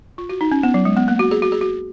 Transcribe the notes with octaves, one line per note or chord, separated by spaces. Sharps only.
F4
F#4
D#4
C#4
B3
F#3
G#3
B3
A#3
F#4
G#4
F#4
G#4
F#4